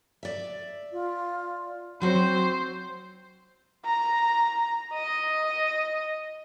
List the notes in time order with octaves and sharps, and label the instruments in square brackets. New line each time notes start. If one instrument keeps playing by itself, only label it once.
[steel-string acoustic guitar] D5 E5
[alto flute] F4
[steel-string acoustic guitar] F#3 F#4 [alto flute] C4 [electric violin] C5
[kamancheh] A#5
D#5